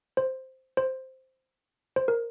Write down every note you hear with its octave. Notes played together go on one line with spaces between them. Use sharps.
C5
C5
C5
A#4